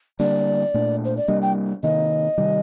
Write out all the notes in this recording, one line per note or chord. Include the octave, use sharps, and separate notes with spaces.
D3 G3 A#3 D4 D5
A#2 A3 D4
C5
D5
C3 G3 A#3 D4 D#5
G5
C3 D#3 A#3 D#5
C3 D#3 G3